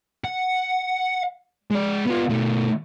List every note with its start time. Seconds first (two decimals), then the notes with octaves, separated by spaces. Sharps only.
0.24 F#5
1.71 G#3 D5
2.06 B3 F4
2.29 B2 A3